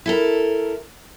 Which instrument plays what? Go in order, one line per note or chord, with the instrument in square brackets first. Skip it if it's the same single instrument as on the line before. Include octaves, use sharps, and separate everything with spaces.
[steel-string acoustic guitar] E4 A4 A#4